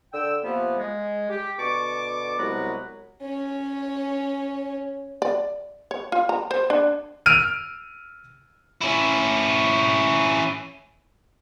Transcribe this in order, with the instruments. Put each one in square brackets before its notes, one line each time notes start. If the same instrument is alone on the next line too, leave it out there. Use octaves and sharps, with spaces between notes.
[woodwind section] D3 G5 E6
C3 F3 A#3 B3
G#3
G4
B2 D3 A5 C#6 D6
C2 F#3 G#3 B3 B4 A#5
[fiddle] C#4 C#5
[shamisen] D5
C#5
F4
A#5
C5
D4
[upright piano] E6 F6 D7 D#7 F7
[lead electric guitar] C#4 E4